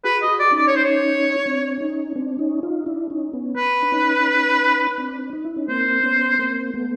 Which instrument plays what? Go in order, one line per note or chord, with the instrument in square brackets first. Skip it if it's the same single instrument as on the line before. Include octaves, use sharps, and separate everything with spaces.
[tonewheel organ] F#4 G#4 [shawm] B4
[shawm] D#5
[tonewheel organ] F#4 G#4
[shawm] D5
[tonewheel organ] C#4 D#4
[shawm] D5
C#5
C5
C#5
[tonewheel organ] C4 D4
C#4 D#4
C4 D4
C#4 D#4
D#4 F4
D4 E4
C#4 D#4
B3 C#4
[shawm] B4
[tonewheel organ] D4
C#4 D#4
C4 D4
D#4
E4
C#4 D#4
[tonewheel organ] A#3 C4 [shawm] C5
[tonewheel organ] B3 C#4
A#3 C4
A3 B3